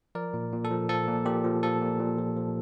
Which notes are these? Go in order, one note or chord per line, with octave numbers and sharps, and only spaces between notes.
F3 A#4 D5
A#2
A#2
A4
F3
F3 A4
A#2
A#2 G4
F3
F3 A4
A#2
A#2
F3
F3